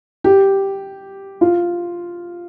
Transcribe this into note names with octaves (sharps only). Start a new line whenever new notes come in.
G4
F4